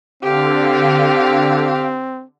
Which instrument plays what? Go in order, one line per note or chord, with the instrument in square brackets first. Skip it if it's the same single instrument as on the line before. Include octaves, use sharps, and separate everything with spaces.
[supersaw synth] D3 [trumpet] C4 [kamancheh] G4 F5